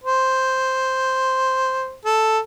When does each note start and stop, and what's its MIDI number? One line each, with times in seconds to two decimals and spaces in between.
0.04 1.94 72
2.05 2.39 69